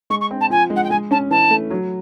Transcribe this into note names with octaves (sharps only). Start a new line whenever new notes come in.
G#3 C#6
C#6
C4
A5
F3 G#5
G#3
F#5
G5
G#3 G#5
C#4 A5
E3 A5
A3
F#3